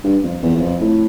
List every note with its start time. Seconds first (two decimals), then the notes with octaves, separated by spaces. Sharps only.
0.04 G2
0.23 F2
0.42 E2
0.56 E2
0.61 F2
0.81 A2